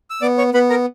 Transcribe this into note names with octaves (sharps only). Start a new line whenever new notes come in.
E6
B3 D5 D6
C#5 C#6
B3 B4 B5
A#4 A#5